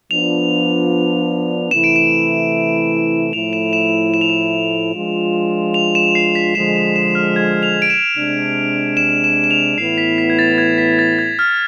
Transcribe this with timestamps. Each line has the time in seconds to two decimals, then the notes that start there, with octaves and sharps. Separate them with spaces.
0.11 F3 B3 D4 F4 F7
1.71 C3 E3 A3 E4 E7
1.84 D7
1.96 E7
3.33 A2 F3 A3 E4 F7
3.53 E7
3.73 E7
4.14 E7
4.21 F7
4.30 E7
4.94 F3 G#3 D4 F4
5.74 F7
5.95 E7
6.15 C7
6.35 B6
6.55 D3 F3 G#3 E7
6.76 E7
6.96 E7
7.15 F6
7.36 G#6
7.63 F7
7.82 D7
7.90 E7
8.16 C3 G#3 D4
8.97 E7
9.24 E7
9.44 E7
9.51 F7
9.78 A2 E3 B3 E4 C7
9.98 B6
10.18 B6
10.30 G#6
10.39 A6
10.58 G#6
10.78 B6
10.99 A6
11.19 G#6
11.39 F6